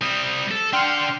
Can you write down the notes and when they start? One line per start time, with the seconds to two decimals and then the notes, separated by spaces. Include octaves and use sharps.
0.01 G3 C4 D#6
0.51 A4
0.73 D4 F#5 G5 C6 F6